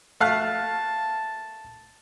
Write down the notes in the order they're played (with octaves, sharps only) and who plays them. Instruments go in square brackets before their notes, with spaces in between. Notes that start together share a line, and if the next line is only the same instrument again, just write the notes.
[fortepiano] A3 F5 F#6 [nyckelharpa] A5